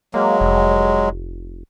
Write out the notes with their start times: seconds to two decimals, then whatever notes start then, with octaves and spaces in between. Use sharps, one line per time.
0.14 F#3 G#3 A#3
0.41 F1